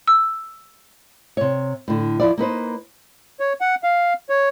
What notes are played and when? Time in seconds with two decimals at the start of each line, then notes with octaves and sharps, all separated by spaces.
0.08 E6
1.37 C3 C#5
1.88 A2 D3
2.20 F3 E4 D5
2.38 A#3 D#4 B4 C5
3.40 C#5
3.61 F#5
3.84 F5
4.30 C#5